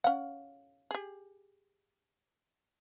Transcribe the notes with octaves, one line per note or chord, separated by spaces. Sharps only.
C#4 F5 F#5
G4 G#4